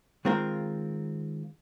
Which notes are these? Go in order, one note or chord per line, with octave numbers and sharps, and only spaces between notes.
D#3 G#3 C4 F4 A#4